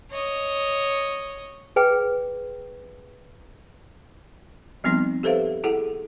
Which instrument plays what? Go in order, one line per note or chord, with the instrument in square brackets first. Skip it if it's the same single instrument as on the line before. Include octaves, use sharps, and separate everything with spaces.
[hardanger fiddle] C#5 D#5
[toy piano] G#4 B4 G5
[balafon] F3 G3 B3 C4 D#4
G4 A4 B4 C5 E5 F5
E4 G#4 A4 F#5